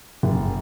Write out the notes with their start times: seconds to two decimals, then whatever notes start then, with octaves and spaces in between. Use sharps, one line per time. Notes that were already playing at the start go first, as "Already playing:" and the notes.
0.23 F#1